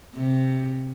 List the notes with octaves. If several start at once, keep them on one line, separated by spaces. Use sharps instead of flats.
C3